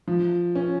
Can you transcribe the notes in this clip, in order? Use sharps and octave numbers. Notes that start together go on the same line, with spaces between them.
F3
C#4